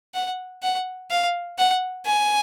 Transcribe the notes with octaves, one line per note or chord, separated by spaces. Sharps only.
F#5
F#5
F5
F#5
G#5